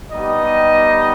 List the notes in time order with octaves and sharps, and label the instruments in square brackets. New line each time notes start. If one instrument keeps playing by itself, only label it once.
[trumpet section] G3 B3 D#4 G4 D#5